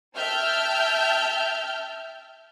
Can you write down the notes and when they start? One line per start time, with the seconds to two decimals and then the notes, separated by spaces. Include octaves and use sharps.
0.16 E5 G5 A5 F6 G6